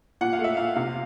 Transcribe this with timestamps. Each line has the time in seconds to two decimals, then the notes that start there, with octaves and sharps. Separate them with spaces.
0.21 A#2 F#5
0.33 F5
0.39 A3
0.44 E5
0.57 A#2 F5
0.76 C3 F5